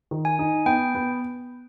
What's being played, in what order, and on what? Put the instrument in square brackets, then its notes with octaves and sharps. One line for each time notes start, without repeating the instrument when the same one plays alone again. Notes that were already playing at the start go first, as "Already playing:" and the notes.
[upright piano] D#3
[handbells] G#5
[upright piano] D#4
[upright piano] B3 [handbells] G5
[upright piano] B3